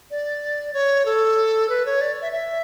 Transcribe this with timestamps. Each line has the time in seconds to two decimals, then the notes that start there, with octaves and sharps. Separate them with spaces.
0.11 D5
0.74 C#5
1.06 A4
1.69 B4
1.86 C#5
2.01 D5
2.22 E5
2.32 E5